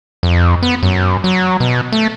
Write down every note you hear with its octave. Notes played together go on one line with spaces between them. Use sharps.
F2
B3
F#2
F#3
B2
A3